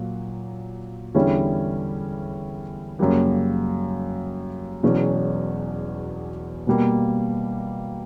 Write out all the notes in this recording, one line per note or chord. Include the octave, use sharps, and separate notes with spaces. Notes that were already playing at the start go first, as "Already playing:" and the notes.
Already playing: A#2 F#3 A#3
E2 D3 G3 C#4 E4
F#2 C#3 G3 A#3
E1 E2 B2 F#3 C#4
B2 G3 A#3